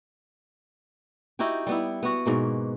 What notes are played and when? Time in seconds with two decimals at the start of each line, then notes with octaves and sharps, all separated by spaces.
1.39 D#4 E4 F#4 G4
1.67 G3 B3 E4
2.03 B3 F#4
2.26 G#2 B2 A#3